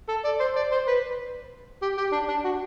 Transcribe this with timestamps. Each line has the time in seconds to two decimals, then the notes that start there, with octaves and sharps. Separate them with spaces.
0.09 A4
0.25 D5
0.40 C5
0.56 D5
0.72 C5
0.88 B4
1.82 G4
1.98 G4
2.13 D4
2.28 D4
2.45 F#4